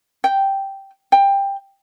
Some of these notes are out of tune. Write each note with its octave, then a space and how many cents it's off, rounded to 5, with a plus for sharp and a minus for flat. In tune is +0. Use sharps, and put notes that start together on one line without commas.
G5 -5
G5 +15